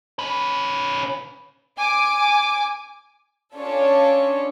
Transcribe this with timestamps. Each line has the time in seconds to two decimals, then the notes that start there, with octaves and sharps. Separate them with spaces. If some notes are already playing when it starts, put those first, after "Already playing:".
0.19 C#4 B4
1.77 G#5 D6
3.56 C#4 D4 F4 A4 C#5